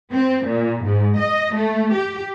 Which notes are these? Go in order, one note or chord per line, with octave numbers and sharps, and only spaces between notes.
C4
A#2
G#2
D#5
A3
G4